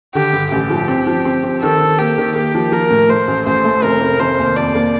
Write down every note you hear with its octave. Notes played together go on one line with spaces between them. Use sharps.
D3 G4
G2
A1 G4
F3
C4
F3
C4
C4
D#3 A4
D#3
A#3 G4
D#3
A#3 G4
F3
F3 A#4
A2
A3 C5
A1
A1 C5
A3
F1 A#4
F1
F1 C5
D#2
F2 D5
A#3